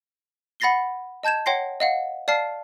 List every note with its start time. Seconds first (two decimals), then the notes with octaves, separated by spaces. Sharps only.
0.60 F#5 B5 A6 A#6 C7 G7
1.23 D#5 A5 G6 G#6 E7
1.46 C#5 F#5 G5 C6 A#6 C7
1.80 D#5 F5 F#5
2.28 D5 F5 A5 F6 C7